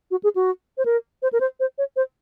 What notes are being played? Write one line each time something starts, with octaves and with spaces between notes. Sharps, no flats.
F#4
G#4
F#4
C5
A#4
C5
A#4
C5
C5
C#5
C5